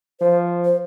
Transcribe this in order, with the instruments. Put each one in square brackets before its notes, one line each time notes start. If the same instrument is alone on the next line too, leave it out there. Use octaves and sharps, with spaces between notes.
[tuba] F3 [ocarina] C5
[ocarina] C5